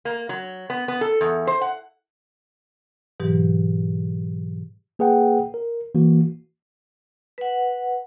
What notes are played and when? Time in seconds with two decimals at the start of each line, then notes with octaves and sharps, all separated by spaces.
0.05 A#3
0.29 F#3
0.70 B3
0.88 B3
1.01 A4
1.21 E2
1.47 C5
1.61 F#5
3.20 G#2 B2 E3 F#3 G4
4.99 A#3 G#4 B4 F#5 G5
5.54 A#4
5.95 E3 A#3 F#4
7.38 B4 F#5